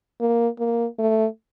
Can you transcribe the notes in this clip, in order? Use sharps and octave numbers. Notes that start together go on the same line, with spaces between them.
A#3
A#3
A3